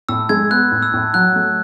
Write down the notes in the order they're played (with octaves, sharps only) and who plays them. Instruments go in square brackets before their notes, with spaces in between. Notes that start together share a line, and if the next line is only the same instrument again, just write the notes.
[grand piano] A2 [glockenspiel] E6
[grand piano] G#3 [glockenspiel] G#6
[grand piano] B3 [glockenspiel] F#6
[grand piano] A2
[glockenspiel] E6
[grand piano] A2
[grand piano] F#3 [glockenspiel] F#6
[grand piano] A3